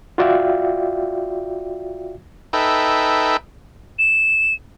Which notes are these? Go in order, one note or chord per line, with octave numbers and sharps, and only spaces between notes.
F4 F#4 D5 E5 F5 G5
D#4 A4 B4 E5 G5
E7